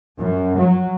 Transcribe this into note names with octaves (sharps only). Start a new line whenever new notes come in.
F#2
F#3